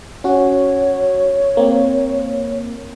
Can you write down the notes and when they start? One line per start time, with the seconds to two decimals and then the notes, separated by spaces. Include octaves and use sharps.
0.24 C#4 F#4 C#5
1.57 A#3 C4